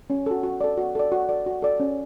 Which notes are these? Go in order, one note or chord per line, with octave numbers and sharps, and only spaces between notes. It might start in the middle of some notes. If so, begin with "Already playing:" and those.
C#4
F#4 A4
F#4
A4 D5
F#4
A4 D5
F#4
A4 D5
F#4
A4 D5
C#4